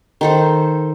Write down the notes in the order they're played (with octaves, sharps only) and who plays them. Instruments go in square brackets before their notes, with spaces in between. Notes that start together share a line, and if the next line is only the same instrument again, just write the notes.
[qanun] D#3 A4 C5